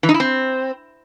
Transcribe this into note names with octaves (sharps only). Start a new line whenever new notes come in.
E3
D#4
E4
C4